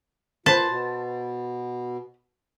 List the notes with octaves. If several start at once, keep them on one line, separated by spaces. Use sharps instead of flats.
A#2 B4 C5 A5
B2